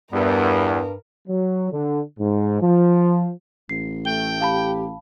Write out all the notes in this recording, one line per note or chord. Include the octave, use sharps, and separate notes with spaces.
E2 G2 G3 B3 A#4
F#3
D3
G#2
F3
A1 C7
A3 G5 G7
G4 F5 A5 B5